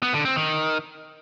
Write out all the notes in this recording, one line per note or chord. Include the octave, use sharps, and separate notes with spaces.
B3
D3
C4
D#3